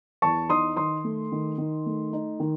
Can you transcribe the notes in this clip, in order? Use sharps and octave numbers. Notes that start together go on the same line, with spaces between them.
E2 A5 C#6
D#4 C6 D#6
D#3 C6 D#6
A3
D#3
D#3
A3
D#4
D#3